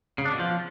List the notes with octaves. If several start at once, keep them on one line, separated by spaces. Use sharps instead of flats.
C#3
D4
B2
F3